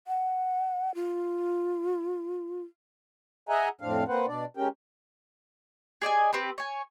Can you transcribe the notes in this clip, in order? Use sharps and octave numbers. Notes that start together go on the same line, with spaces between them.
F#5
F4
G#4 D#5 E5 F#5 G#5 A#5
F2 A2 C4 D4 F5
A#3 C4 B4 C5 F#5
B2 D4 D5
G#3 C#4 G4 A#4 G5
G#4 D5 D#5 G#5
C4 G4 B4
C#5 G#5